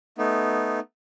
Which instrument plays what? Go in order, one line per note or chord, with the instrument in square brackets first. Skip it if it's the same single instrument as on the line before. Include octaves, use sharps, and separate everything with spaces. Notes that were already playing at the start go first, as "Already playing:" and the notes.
[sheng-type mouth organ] A3 B3 D#4